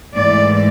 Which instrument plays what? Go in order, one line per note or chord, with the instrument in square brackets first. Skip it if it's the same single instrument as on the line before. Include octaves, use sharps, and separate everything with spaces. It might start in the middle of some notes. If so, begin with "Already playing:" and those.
[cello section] G#2 E3 A3 D5